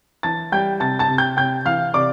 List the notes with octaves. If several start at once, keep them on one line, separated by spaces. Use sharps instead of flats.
E3 A5 A6
G3 G5 G6
C3 A5 A6
A5 A6
C3
G5 G6
C3 G5 G6
E3 F5 F6
C3 D5 D6